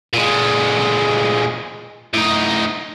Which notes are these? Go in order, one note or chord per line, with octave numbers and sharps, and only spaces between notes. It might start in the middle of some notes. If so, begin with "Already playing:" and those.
A#2 G#3
A2 D#4